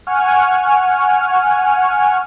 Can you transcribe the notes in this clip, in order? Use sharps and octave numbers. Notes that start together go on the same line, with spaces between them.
F#5 G#5 C#6 F6